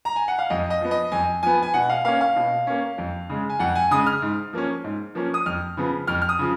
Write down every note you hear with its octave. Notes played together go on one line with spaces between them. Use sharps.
A#5
G#5
F#5
F5
F2 D#5
D#5
F3 B3
D#5
F2 G#5
F3 B3 G#5
G#5
B2 F#5
F5
A#3 C#4 F5
F5
B2
A#3 C#4
F2
C#3 G#3
G#5
F2 F#5
G#5
C#3 G#3 D#6
F6
G#2
F3 A#3 C#4
G#2
F3 A#3 C#4
D#6
F2 F6
C#3 F3 B3
F2 F6
F6
D#6
C#3 F3